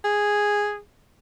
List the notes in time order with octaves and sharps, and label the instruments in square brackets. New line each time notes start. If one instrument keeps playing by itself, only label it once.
[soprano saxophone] G#4